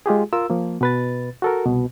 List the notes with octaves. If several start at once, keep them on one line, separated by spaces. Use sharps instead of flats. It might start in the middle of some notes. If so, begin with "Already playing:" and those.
G#3 F4 G4 G#4
F4 A#4 E6
F3 A#3
B2 B4 A6
F#4 A4 A#4
C2 B2